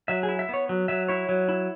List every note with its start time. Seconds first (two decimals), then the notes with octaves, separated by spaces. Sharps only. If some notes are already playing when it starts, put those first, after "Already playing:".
0.08 F#3 E5
0.23 G#4
0.28 E4
0.39 E5
0.49 B3 C#5
0.69 F#3
0.88 F#3 E5
1.08 E4 C#5
1.29 F#3
1.49 E4